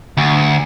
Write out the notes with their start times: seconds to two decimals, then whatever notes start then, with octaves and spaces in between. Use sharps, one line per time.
0.17 D2